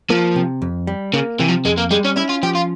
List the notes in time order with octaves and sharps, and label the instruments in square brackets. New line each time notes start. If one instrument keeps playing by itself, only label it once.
[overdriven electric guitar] F3 [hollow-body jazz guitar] A#3
[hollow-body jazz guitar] C3
F2
G3
[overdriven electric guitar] C#3 [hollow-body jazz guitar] A#3
[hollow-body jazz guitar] C3 [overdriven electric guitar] E3
[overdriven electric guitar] F3
[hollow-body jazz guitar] F2 [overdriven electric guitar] G#3
[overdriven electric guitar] A#3
[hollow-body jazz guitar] G3 [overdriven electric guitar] G#3
[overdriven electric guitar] C#4
[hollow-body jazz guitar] C#4 [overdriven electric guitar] E4
[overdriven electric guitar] F4
[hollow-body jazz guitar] F3 [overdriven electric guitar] G4
[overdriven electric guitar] F4